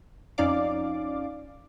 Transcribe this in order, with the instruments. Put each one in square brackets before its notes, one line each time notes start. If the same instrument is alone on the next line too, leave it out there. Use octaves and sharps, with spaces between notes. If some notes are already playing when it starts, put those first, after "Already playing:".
[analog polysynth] F2 C#4 D#4 D5 F5 D6